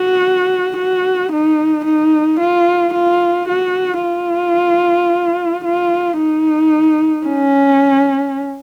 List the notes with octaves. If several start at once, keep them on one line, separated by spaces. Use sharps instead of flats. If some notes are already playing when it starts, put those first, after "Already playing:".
Already playing: F#4
F#4
D#4
D#4
F4
F4
F#4
F4
F4
D#4
C#4